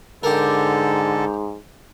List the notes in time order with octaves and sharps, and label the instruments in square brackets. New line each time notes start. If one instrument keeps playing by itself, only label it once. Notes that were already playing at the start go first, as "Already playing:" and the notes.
[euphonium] G#2 [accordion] D3 A4 [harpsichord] G4 A#4